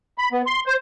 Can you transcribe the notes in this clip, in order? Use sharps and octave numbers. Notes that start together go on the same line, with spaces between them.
B5
B3
C6
C5